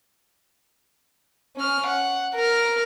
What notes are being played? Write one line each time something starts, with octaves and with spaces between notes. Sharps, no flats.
C#4 F6
F#5
A#4 F6